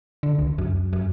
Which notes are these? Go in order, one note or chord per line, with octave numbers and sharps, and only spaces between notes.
D3
C#2
F#2
F#2